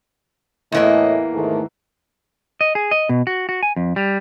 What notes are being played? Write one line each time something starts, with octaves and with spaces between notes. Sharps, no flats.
E2 A2 E3 A#3 D#5
G#2 D#3 A3
D#5
G#4
D#5
B2
F#4
F#4
G#5
F2
G3